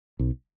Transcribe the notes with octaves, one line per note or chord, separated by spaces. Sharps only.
B1